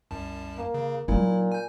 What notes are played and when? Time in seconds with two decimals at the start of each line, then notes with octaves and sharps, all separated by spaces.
0.11 C2 F#2 A5
0.58 A#3
0.74 C#3
1.08 A#2 F#3 D#4 E4
1.52 G#5 G6